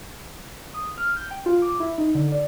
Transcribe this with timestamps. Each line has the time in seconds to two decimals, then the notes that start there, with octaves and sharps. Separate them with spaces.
0.74 D#6
0.97 F6
1.16 G6
1.31 G5
1.46 F4
1.62 D6
1.80 E4
1.98 D#4
2.15 D3
2.32 D5